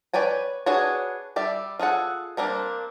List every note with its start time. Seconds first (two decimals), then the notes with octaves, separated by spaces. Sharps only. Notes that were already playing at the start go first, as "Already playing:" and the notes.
0.13 B4 C#5 D5 G5 G#5
0.66 D4 F#4 G#4 B4 C#5
1.36 G3 D5 E5
1.79 F4 G#4 A4 F#5
2.37 G3 A#3 C4 D4